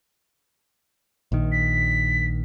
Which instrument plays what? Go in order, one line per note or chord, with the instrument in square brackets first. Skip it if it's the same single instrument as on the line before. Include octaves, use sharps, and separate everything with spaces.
[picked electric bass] A#1 D#3
[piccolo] B6